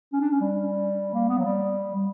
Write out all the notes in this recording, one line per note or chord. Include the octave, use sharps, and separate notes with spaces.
C#4
D4
C#4
G3
A#3
B3
F#3
G3
G3